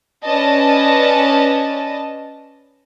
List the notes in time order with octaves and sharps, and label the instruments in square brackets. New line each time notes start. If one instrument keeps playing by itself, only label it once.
[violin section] C#4 B4 D5 D#5 A5